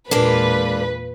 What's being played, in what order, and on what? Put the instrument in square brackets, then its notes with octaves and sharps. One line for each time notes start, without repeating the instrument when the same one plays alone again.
[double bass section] E2 A#2 [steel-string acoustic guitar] G#3 A#3 D4 [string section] B4